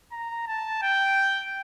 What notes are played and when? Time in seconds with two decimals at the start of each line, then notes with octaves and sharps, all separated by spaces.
0.12 A#5
0.47 A5
0.82 G5